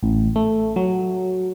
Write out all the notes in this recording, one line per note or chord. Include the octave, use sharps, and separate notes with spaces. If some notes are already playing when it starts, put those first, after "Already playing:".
A1
A3
F#3